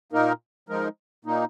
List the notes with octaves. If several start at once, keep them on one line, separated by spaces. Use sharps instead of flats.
A#2 A#3 D#4 A#4
F3 G#3 D#4 A#4
A#2 A#3 D#4